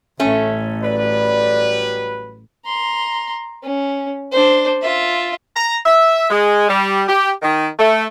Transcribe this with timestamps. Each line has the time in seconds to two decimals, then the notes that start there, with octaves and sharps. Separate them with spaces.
0.19 A1 A3 C#4 A4
0.82 F#3 G3 B4 D5
2.65 A#5 C6
3.63 C#4
4.32 D4 C5
4.82 F4 E5
5.56 A#5
5.86 E5
6.30 G#3
6.69 G3
7.08 G4
7.43 D#3
7.79 A3